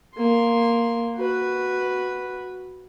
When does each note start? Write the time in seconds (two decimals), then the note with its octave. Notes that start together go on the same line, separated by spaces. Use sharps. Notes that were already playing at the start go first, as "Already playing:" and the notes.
0.15 A#3 C6
1.16 F#4 B4